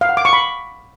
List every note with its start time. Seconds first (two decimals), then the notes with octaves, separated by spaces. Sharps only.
0.01 F5
0.09 F#5
0.17 D6
0.25 C#6
0.33 B5